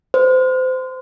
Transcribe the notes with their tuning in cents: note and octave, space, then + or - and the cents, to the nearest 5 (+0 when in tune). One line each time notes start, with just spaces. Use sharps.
C5 -25